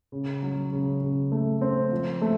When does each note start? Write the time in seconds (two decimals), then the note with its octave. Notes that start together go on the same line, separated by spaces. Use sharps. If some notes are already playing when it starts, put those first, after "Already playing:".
0.12 C#3
0.43 F#3
0.72 C#3
1.02 C#3
1.32 A3
1.61 C4
1.92 F3
2.22 A3